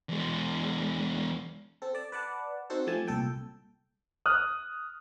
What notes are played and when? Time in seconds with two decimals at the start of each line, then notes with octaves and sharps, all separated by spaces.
0.09 E2 G#3
1.82 C4 A4
1.95 D5 A5
2.12 B4 D5 F#5 A5
2.70 C4 D#4 F#4 A4 C5
2.87 F3 A3 G4 G#5 A5
3.07 C2 A#2 A4 G5
4.26 D#6 F6 F#6